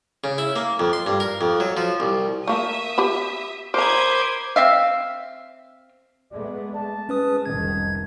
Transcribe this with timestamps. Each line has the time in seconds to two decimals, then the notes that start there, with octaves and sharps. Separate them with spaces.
0.24 C#3
0.38 E4
0.56 A#3
0.80 F2
0.93 C6
1.06 G2
1.20 A#4
1.41 F2
1.60 F#3
1.77 F3
2.00 C2
2.47 A3 A#3 E5 D#6
2.98 G4 D5 B5
3.74 A#4 C5 A#5 B5 D6 D#6 G#6
4.56 C4 E5 F5
6.32 G#3 A3 B3 D5
6.75 A5
7.09 G#3 C#4 B4 D#6
7.46 F1 C2 D#3 G#6